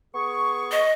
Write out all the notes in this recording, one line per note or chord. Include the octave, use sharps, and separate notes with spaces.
B3 G#4 C#6
D#5